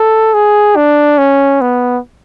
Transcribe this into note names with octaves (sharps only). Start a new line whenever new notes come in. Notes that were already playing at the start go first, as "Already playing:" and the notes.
Already playing: A4
G#4
D4
C#4
B3